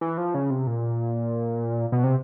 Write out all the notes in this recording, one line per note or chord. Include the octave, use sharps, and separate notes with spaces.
E3
F3
C#3
C3
A#2
B2
C3